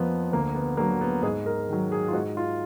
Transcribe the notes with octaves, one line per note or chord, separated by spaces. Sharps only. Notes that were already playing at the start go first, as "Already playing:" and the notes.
Already playing: F2 F3 A#3 B3
D2 A#3
B3
D3 F#3 A#3
B3
G#2 G#4
A#4
D#3 F#3
G#4
F4
G#2 F#4
F4